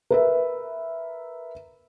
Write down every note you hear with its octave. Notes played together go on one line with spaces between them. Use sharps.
A#4 B4 E5